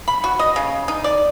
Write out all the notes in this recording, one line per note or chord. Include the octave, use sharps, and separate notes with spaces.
B5
F#4
D#5
C#3
D#4
D5